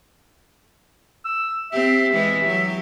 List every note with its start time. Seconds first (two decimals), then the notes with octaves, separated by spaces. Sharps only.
1.25 E6
1.72 C4 G4 E5
2.13 E3 G#3 G4
2.46 F#3 G4